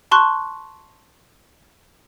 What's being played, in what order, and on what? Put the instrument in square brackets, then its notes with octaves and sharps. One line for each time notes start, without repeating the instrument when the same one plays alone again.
[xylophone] A5 C6 C#6 F#6